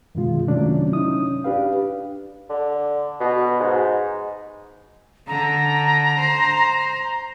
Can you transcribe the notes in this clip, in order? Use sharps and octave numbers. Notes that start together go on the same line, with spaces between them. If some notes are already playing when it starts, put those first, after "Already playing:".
F#2 B2 D3 D#3 G#3 F4
C3 D#3 F#3 A3 C#4 D4
C#4 D#4 E4 D#6
D4 G4 B4 F5
D3
B2
G#2
D3 A#5
C5